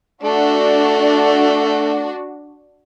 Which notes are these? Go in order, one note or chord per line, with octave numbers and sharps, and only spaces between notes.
A3 D4 F#4